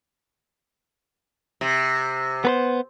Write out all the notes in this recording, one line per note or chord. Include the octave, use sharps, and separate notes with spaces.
C3
B3 B4 C5